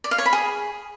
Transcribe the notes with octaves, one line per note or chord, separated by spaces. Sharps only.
D5
F5
C#5
B5
G#4